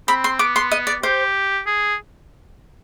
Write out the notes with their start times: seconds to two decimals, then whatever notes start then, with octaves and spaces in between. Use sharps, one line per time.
0.08 C4 B5
0.24 C6
0.39 B3 D6
0.56 C6
0.72 D#5
0.87 D5
1.03 G4 C5
1.66 G#4